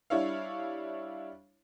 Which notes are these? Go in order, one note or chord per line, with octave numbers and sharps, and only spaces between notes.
G3 D4 E4 C#5 F5